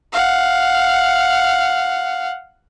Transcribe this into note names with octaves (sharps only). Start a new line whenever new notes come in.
F5 F#5